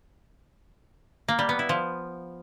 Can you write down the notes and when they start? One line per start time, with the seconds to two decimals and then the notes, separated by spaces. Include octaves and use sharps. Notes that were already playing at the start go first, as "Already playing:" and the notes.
1.28 A#3
1.39 G3
1.49 B3
1.59 E4
1.69 F3